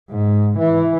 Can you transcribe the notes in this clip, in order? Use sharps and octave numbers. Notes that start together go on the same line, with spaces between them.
G#2
E3